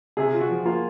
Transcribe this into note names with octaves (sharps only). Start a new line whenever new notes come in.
C3 G#4
F4
F#4
F3
A#3 F4